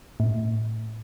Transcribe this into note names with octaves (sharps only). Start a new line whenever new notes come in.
A2